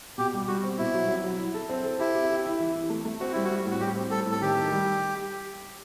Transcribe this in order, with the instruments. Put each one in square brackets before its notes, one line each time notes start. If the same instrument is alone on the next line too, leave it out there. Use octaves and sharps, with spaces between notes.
[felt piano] B2 [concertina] G4
[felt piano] G3
[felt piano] G3 [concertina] F#4
[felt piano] C4
[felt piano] B2 [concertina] E4
[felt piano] F#3
F#3
F#3
E4
A4
C4
A4
[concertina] E4 [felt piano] G4
[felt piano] G4
G4
E4
E3
E3
A3
A3
[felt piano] C4 [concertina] F#4
[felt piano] G3 [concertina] E4
[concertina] F#4
[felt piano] G3
[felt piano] A2 [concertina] F#4
[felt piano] G3 [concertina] G4
[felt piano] C4
[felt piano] G3 [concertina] A4
[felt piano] A2
[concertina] A4
[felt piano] D#3 [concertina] G4
[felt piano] D#3
G3